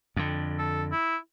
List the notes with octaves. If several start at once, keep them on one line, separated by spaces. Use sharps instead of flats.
F2 D3
A4
E4